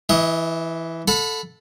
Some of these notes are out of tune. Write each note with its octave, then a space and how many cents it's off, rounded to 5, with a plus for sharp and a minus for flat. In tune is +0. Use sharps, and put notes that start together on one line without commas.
E3 +0 D#5 +45 D#6 +25
A4 +0 F#5 -35 B5 +15